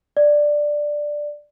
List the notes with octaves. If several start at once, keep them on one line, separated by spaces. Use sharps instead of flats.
D5